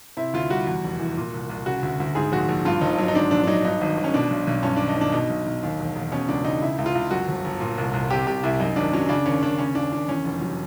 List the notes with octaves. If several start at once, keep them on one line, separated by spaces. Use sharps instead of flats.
C3 E4
D2 F4
G3 F#4
E2
F1
E3
A#2
C2
C2
C#3 F#4
D2
D2
G#2 G#4
A#1 F#4
A#1
G2 F4
G1 D#4
F#3
D#4
G#2 D4
A#1 D4
D4
F#3 D#4
G2 D#4
G#1
G#1
C#4
B2 D4
B1
B1
G2 C#4
D4
G#1
D#4
G#1
D4
B2 D#4
B1
B1
D#2
E1
E1
B2 C#4
C#2 D4
C#2 D#4
C#3 E4
C#2
F4
C#2
F#2 F#4
G1
G1
A#2
C2
C2
C3 G4
C2 G4
C2 E4
F#2 D#4
G#1 D4
F#3 C#4
C#3 D4
D#2 C#4
D#2 D4
C#3 C#4
D#2 D4
D#2 D4
E2 C#4
F1
F#3